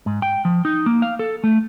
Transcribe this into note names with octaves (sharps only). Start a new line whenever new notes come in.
G#2
G5
F3
D#4
A#3
F5
A4
A3